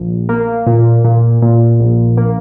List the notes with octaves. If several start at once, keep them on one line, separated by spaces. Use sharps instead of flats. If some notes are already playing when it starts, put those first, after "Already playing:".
Already playing: A#1
A#3
A#2
A#2
A#2
A#1
A#3